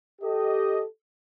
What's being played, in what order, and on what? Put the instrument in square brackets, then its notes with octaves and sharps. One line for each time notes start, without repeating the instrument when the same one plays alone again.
[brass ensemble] G4 A4 D#5